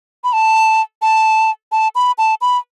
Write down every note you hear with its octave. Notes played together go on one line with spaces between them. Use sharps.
B5
A5
A5
A5
B5
A5
B5